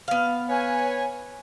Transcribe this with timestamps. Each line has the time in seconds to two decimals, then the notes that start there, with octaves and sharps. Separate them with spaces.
0.08 B3 F5
0.49 B4 C#5 G#5